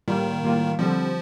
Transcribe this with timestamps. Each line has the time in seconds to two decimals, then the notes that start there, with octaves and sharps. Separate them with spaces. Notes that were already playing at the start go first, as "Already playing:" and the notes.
0.08 A2 D#3 G3 A#3 F4
0.43 A2 G3 A#3 F4
0.79 D3 F3 G3 C4